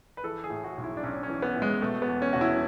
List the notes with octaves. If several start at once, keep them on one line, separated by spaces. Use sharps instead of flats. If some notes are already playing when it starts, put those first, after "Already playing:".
B4
E3 A4
G#4
A2
F#4
B1
E4
D4
B1 C#4
C#4
E3
B3
A2
G#3
B2 A3
B3
E2
C#4
E1 F#4
E4